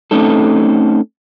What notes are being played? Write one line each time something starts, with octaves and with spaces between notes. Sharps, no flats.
A3 C4 C#4 D#4 A4